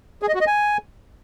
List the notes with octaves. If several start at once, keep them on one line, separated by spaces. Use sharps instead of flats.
G#4
D#5
F#4
D#5
G#5